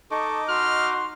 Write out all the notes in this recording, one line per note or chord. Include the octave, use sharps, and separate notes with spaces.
D#4 A4 D#5 C#6 D6
F#4 C6 F6